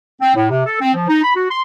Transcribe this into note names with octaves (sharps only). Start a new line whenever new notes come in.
C4
A2
C3
A4
C4
F3
D#4
B5
F#4
C6